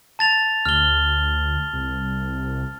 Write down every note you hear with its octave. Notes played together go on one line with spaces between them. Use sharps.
A5 A6 F7
D2 F6 G7
C2